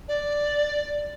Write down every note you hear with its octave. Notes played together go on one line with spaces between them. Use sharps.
D5